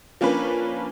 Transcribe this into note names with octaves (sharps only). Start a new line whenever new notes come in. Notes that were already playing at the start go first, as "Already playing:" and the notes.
F3 A#3 C#4 D4 B4